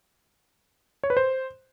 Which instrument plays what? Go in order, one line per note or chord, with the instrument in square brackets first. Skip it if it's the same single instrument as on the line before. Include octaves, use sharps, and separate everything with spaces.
[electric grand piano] C#5
B4
C5